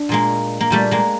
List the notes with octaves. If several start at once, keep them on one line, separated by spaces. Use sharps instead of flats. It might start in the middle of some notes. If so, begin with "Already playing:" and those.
Already playing: D4
A#2 G#3 A#3
A#3
A#2 G3 A3
G#3 A#3